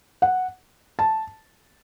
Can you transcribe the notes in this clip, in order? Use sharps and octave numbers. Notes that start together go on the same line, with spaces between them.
F#5
A5